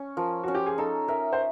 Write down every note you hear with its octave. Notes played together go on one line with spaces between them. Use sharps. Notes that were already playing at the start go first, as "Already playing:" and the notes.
Already playing: C#4
F3 A#4
C#4 F#4
G4
G#4
D#4 A4
A#4 E5
C5